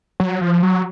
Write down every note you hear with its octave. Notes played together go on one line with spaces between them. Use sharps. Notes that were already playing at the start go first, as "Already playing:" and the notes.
F#3
F3
F#3